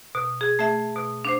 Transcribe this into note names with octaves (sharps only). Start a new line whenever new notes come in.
B2
G#4
A3 G#4 E5
B2
D4 C5